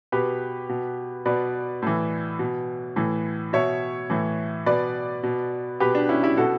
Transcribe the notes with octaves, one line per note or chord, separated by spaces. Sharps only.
B2 G4 B4
B2
B2 B4 D5
A2 E3
B2
A2 E3
B2 C#5 E5
A2 E3
B2 B4 D5
B2
B2 G4 B4
D4
C#4 E4
E4 G4
B2 F#4 A4